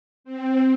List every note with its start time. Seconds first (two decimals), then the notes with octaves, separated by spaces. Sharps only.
0.24 C4